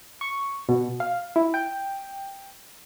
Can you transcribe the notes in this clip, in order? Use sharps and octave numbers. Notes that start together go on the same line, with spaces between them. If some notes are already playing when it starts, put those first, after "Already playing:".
C#6
B2
F5
E4
G5